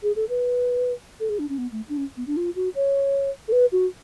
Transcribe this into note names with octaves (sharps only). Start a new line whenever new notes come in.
G#4
A4
B4
A4
G#4
D4
C#4
B3
A3
D4
C#4
B3
D4
F4
F#4
C#5
A4
B4
F#4